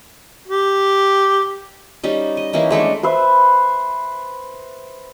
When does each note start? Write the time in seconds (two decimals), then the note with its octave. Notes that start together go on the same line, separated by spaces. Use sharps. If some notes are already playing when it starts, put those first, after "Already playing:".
0.48 G4
2.03 G3 C#4 D#4
2.37 D#5
2.53 E3 A#3 C#4 D#4
2.71 G#3 A3 C#4 D4
3.03 B4 C5 E5